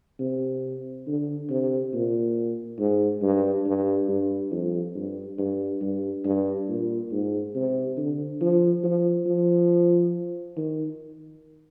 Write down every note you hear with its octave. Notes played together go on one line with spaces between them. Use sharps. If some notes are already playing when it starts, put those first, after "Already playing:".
C3
D3
C3
A#2
G#2
G2
G2
G2
F2
G2
G2
G2
G2
A#2
G#2
C3
D3
F3
F3
F3
D#3